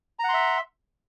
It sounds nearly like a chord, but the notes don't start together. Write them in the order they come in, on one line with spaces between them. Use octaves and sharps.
A#5 F#5 C6 E5